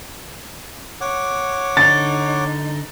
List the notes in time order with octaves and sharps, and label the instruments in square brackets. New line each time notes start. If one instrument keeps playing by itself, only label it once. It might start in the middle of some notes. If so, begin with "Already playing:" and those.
[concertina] C#5 F#5 D6
[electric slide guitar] D3 D#4 [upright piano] A6